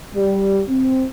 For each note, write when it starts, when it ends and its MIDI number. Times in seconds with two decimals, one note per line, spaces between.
0.15 0.61 55
0.69 1.06 60